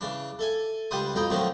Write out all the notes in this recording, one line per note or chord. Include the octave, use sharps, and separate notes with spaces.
C#3 E3 D4
A4 E5 G#5
C#2 G3 B4 C5 B5 D#6
B1 F2 D#4 G5 B5
D3 D#3 F3 F#3 A3 C4